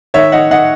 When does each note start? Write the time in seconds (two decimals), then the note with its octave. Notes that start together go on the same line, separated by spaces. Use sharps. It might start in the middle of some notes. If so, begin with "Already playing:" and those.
0.14 D#3 C#5 E5
0.32 D#3 D#5 F#5
0.51 D#3 D#5 F#5